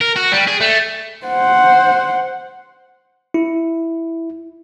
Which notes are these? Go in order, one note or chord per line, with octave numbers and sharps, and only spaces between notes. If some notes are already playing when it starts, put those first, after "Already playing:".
A#4
F#4
G3
G#4
A3
C5 F#5
E4